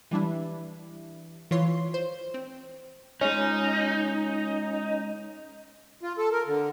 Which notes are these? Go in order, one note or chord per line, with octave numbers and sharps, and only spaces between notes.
E3 G3 D4 E4
E3 F4 C#5 C6
C5
C4
G#3 C#4 D#4
F4
A4
A#4
D3